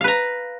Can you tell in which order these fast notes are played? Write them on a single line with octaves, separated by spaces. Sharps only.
F5 B4 A#5